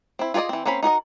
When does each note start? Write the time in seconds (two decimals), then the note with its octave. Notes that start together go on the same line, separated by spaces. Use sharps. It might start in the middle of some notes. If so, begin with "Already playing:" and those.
0.19 C4 E4
0.34 F4 G#4 A4 D5 D#5
0.49 E3 C4
0.66 A#3 C4 C#4 F5 B5
0.83 D#4 F#4 A#4 D#5